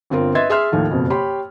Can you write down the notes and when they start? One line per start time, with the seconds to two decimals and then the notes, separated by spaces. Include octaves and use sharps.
0.10 G1 C4 F4 A#4
0.35 B4 D#5 E5 C6 G#6 A6
0.50 G#4 E5 C6 F6
0.72 D#2 A2 D#3 F3
0.91 F#1 F2 B2
1.10 G4 C#5 G5 B5 C6